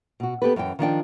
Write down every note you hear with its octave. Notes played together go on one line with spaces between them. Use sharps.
B2 F#4
B3 G4 A4 B4
F#2 E3 C#4 G5
D#3 F3 D4 G5